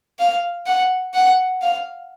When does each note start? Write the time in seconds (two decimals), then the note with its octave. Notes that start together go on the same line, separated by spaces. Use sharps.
0.19 F5
0.67 F#5
1.14 F#5
1.62 F5